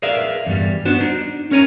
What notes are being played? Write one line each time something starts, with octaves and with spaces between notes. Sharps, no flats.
G#4 A#4 B4 D5 E5 F5
E2 G2 G3
B3 D4 F#4 C5
D4 D#4
C#4 A#4 C#5 G#5 A#5